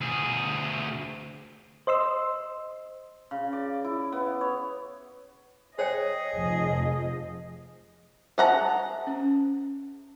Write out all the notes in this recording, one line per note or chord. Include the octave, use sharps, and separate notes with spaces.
D2 G#4
C5 D#5 C6 E6
C#3
D5
E4
B3
C#5
G#4 C5 C#5 D#5 G5
F1 F3
G#4 C5 E5 F#5 A5 A#5
C#4